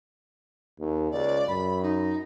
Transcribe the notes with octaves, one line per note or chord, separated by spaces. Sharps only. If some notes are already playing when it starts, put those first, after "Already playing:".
D#2
C#2 D5
F#2 B5
D#4